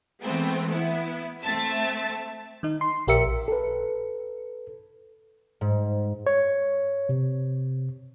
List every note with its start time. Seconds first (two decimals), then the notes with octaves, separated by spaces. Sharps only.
0.22 E3 G#3 A3 B3 C4
0.69 B3 E4
1.43 A3 C4 E5 A5
2.63 D#3 D#4
2.81 C6
3.07 A#1 G4 A#4 E5 C#7
3.48 A4 B4
5.61 G#2
6.26 C#5
7.09 C3